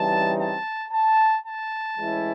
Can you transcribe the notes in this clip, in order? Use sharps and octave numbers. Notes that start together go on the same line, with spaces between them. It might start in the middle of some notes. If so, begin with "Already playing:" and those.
Already playing: C#3 E3 G3 C4 D#4 A5
A5
A5
A5
A2 E3 G#3 C#4 E4